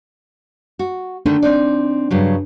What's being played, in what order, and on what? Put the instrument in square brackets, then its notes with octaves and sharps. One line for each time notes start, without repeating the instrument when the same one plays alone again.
[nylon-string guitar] F#4
[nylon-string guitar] D3 D#3 A3 [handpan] D4
[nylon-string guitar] C4 D#4 D5
G2 C#3 F#3